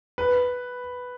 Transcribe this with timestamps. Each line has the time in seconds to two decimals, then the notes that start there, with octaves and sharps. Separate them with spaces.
0.18 B4